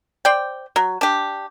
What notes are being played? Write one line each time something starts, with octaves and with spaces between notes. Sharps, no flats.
C5 D5 G5
F#3
D4 G4